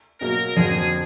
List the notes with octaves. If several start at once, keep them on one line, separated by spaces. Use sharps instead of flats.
B2 F#3 A#3 A#4
F2 D3 F#3 G#4